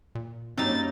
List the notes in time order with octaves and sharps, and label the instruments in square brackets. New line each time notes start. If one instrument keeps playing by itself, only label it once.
[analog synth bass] A#2
[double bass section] F#2 A#3 C#4 [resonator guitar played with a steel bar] F#3 G3 D#4 [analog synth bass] C4 [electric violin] A6